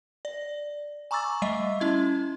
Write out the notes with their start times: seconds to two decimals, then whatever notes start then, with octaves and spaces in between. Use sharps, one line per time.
0.25 D5
1.11 G#5 A#5 C#6 D6 E6 A6
1.42 G3 A3 D#5 E5
1.80 C#4 E4 G#6